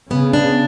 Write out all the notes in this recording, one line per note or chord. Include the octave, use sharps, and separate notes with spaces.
C#3 B3
D4